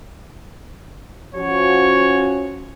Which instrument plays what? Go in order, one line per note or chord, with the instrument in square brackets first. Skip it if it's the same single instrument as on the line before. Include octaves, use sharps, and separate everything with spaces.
[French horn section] F3 C#4 F#4 [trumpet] C#5